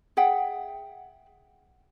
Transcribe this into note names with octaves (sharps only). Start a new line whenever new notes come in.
G#4 E5 F#5 G5